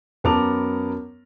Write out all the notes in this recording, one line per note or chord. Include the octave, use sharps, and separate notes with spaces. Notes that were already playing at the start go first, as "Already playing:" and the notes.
F#2 B3 A#4 A5 D6 F7